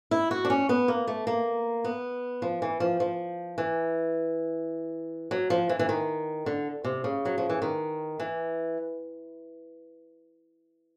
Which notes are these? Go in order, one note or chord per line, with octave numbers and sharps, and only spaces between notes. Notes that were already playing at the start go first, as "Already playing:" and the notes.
E4
F#4
D4
C#4
B3
A#3
A3
A#3
B3
F3
E3
F3
F3
E3
F#3
F3
E3
E3
D#3
D3
C3
C#3
F#3
F3
E3
D#3
E3